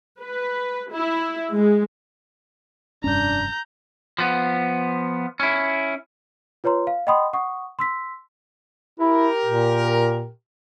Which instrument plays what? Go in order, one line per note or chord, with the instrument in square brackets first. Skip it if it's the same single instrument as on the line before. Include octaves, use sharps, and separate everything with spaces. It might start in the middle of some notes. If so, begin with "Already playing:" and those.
[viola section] B4
E4
G#3
[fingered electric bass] F1 G2 C#4 [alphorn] D4 [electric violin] A#5 G6
[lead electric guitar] F3 B3
C#4 E4
[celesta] F4 B4 C#5 A#5 C6
F5
D#5 F#5 G5 B5 C6 D#6
F#5 C#6 D#6
C6 E6 B6
[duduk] E4 [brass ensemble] G4 A#4
[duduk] A#2